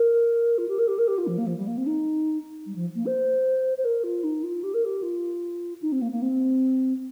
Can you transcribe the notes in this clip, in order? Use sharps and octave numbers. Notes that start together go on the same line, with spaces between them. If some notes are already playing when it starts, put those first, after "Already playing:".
Already playing: A#4
F4
G4
A#4
G4
A#4
G4
F4
F3
A#3
F3
G3
A#3
C4
D#4
G3
F3
A#3
C5
C5
A#4
F4
D#4
F4
G4
A#4
G4
F4
D#4
C4
A#3
A#3
C4